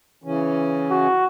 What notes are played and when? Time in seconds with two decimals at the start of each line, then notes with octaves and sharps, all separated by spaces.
0.24 C#3 E3 C#4
0.91 F#4